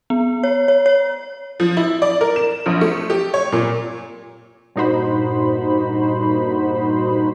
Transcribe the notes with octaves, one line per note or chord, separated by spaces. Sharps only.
B3
C#5
C#5
C#5
F3
E4
D5
A#4
E7
A#1
A3
G4
C#5
A#2
G2 A#2 D#4 F#4 C5 B5